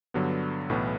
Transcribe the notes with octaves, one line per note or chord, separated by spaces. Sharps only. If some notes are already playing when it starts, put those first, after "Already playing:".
G2 D3 F#3 B3
B1 A2 E3 B3 E4